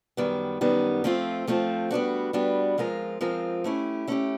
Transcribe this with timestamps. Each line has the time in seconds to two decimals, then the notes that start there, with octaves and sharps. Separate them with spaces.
0.17 F#2 D#3 G3 B3
0.61 F#2 D#3 G3 B3
1.04 F3 A3 C4 F4
1.47 F3 A3 C4 F4
1.91 G3 B3 D4 F#4
2.33 G3 B3 D4 F#4
2.78 F3 G#3 C4 F4 A#4
3.21 F3 G#3 C4 F4 A#4
3.64 A3 C#4 E4 G4
4.07 A3 C#4 E4 G4